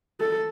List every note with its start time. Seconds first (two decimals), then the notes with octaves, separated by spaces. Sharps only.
0.20 A4